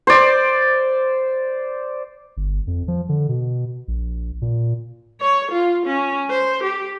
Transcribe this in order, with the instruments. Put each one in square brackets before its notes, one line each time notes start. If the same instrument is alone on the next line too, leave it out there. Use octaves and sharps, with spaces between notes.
[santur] C5 D5
[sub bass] G1
F2
F3
D3
B2
A#1
A#2
[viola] C#5
F4
C#4
C5
G4